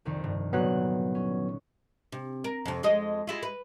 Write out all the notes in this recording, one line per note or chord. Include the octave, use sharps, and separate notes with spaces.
C2 F2 D#3
G2
G1 A#2 F#3 B3 F#6
C#4
C3
A#4
F2 C3
F2 G#3 D#5
G#3 E4 F4
B4